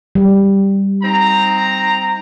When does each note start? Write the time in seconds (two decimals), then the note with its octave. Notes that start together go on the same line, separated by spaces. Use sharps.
0.15 G3
1.03 C4 D#4 A#5